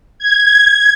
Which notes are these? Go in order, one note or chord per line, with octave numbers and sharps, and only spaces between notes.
G#6